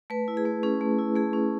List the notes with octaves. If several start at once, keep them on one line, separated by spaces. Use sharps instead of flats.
A3 B4
E4
G#4
A3
C#4 G#4
A3
E4
A3 G#4
C#4